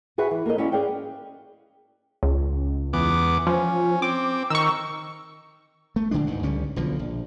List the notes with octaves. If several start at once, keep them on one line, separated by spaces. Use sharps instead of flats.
F#4 G#4 B4 E5 F#5
E3
A#3 A4 A#4 D#5
C#4 E4 F#4 D5 D#5
G#4 B4 D5 F5 G5
C#2
E2 B3 D6
F3 C#4
C4 D6
D#3 C#6 E6
A3
A#1 D3 G#3 D4
G1 D2 G#2 D#3
C#2 D3 G3 C#4
B1 B2 D3 F3
A#1